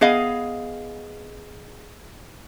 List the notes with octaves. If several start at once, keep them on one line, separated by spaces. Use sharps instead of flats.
B3 G#4 D#5 F5